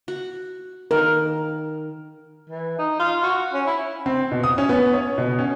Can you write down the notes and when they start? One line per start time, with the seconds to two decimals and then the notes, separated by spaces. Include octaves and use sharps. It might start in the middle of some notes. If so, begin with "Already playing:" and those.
0.08 F#4
0.91 D#3 A#4
2.49 E3
2.79 D#4
2.99 F4
3.23 F#4
3.53 C#4
3.67 E4
4.06 C4
4.31 B2
4.43 D#6
4.58 C#4
4.69 B3
4.93 C#5
5.18 B2
5.39 C#4